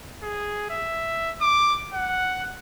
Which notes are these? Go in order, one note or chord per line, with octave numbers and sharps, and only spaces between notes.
G#4
E5
D6
F#5